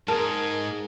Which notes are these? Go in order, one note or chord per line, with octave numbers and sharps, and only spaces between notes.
G#2 G#4 A#4 A5